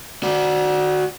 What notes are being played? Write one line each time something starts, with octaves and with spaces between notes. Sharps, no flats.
F#4 D5